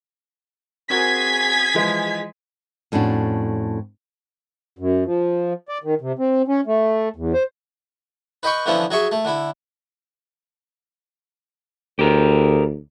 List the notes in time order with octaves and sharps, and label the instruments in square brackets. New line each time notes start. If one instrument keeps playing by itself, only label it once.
[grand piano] C4 F#4 A#4 [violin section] G#4 G#6 B6
[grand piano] E3 F3 G#3
[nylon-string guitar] F2 A2 C#4 D4 F#4
[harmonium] F#2
F3
D5
D#3
C3
C4
C#4
A3
E2
C5
[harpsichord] B4 D#5 G5 B5 C#6
D3 E3 F3 B3 C#4
F#3 G#4 E5 C#6
A3
D3 E4
[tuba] D2 [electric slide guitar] G4 A#4